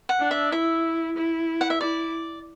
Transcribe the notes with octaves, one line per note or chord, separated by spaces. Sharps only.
F#5
D4
E5
E4 E5
E4
F#5
E5
E4 D5